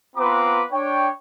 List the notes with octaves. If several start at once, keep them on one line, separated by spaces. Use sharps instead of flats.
B3 C4 F4 B4 A#5 D6
D4 C#5 G5